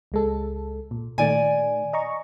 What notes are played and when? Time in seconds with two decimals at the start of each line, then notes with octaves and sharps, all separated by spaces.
0.12 C#2 G#3 A4
0.91 A#2
1.18 A#2 D#3 A3 D5 G#5
1.93 D#5 A#5 C#6